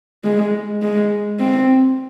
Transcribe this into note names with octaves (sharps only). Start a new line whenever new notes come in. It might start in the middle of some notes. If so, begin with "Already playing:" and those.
G#3
G#3
C4